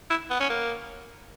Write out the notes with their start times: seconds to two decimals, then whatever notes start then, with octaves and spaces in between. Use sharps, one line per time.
0.10 E4
0.30 B3
0.40 C#4
0.49 A#3